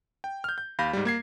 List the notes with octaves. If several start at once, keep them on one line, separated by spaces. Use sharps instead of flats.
G5
F6 G6
G6
D#2 F5 B5 G6 A#6
G#2 G3
A#3 G#6 C7